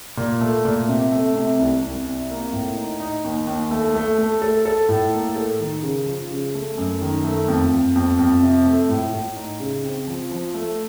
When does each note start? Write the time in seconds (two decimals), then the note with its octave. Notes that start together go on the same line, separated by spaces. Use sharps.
0.17 A#2
0.41 A3
0.65 A#2
0.89 C3
1.12 A3
1.35 C3
1.59 C2
1.82 C2
2.06 C3
2.30 A#3
2.53 A2
2.77 D#4
3.00 D#4
3.24 D#2
3.47 D#2
3.71 A3
3.95 A3
4.18 A3
4.42 A4
4.65 A4
4.89 A2
5.13 A#3
5.36 A4
5.60 D#3
5.83 C#3
6.06 F3
6.31 C#3
6.54 A3
6.78 F#2
7.01 D#3
7.24 A3
7.48 F2
7.72 F2
7.96 F2
8.19 F2
8.42 C3
8.66 A3
8.89 A2
9.13 A2
9.37 D#4
9.60 C#3
9.84 C4
10.08 F3
10.31 F3
10.54 A3